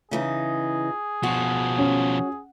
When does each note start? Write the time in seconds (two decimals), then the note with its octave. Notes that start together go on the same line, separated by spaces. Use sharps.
0.11 C#3 E3 D#4 G#4
1.23 B2 F3 F#4
1.78 C#4